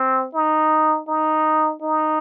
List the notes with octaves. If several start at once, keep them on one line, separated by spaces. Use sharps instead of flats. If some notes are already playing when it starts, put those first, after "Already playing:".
Already playing: C4
D#4
D#4
D#4